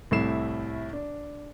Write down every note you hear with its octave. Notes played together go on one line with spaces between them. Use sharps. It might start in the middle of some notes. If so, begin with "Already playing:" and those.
C2 A2 A3 E4 C7 E7
D4